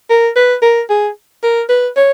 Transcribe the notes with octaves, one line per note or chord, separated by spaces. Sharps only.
A#4
B4
A#4
G#4
A#4
B4
C#5